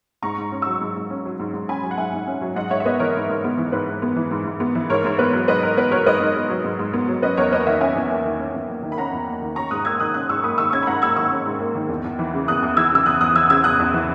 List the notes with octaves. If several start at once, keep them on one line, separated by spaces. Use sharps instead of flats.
G#2 A#5 C#6
G#2
C#4
F#3 C#6 E6
G#2
G#2
C#4
F#3
G#2
G#2
C#4 G#5 B5
F#3
F#5
G#2 E5 G#5
G#2
C#4
F#3
G#2 D#5 F#5
G#2 C#5 E5
E5
B3 B4 D#5
E3 A#4 C#5
G#2
G#2
B3
E3
G#2 B4
G#2
B3
E3
G#2
G#2
B3
E3
G#2 A#4 C#5
G#2
B3 B4
F#3
G#2 B4 D#5
G#2 A#4
B3 B4
F#3 A#4 C#5
G#2 B4 D#5
G#2
B3
F#3
G#2
G#2
B3
F#3
C#4 B4 D#5
E2 A#4 C#5
A#3 B4 D#5
D#3 C#5 E5
C#4 E5 G#5
E2
A#3
D#3
C#4
E2
A#3
D#3
B5
C#4 F#5 A#5
E2
A#3
D#3
C#4 A#5 C#6
G#2 D#6 F#6
A#3 E6 G#6
D#3 D#6 F#6
C#4 D#6 F#6
G#2 C#6 E6
A#3 B5 D#6
D#3 C#6 E6
C#4 E6 G#6
B5
G#2 F#5 A#5
A#3 E6 G#6
D#3 C#6 E6
C#4
G#2
A#3
D#3
E2
E2
E3
C#3
E2 D#6 F#6
E2
E3 E6 G#6
C#3 E6
E2 D#6 F#6
E2 D#6 F#6
E3 E6 G#6
C#3 E6 G#6
E2 D#6 F#6
E2
E3